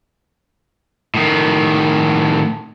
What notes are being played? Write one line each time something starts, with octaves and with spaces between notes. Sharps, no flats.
A2 D#3